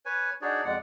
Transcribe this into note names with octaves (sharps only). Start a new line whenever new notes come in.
B4 C#5 G#5
D4 D#4 F#4 G#4 C#5 D5
F2 B2 G#3 D5 F#5